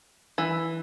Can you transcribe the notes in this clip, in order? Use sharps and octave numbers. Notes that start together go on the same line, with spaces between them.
E3